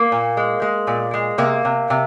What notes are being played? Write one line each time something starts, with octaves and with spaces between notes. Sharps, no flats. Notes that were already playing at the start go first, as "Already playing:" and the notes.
Already playing: A#3
A#2
G#3
G#3
A#2
G#3
C3 A#3
C3
C3